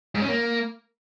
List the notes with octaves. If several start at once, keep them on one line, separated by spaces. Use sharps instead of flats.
G#2
C#4
A#3